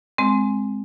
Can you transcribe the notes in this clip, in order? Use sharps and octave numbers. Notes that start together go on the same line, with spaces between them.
G#3 C4